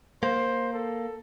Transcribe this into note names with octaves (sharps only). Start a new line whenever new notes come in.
A#3 C5
A4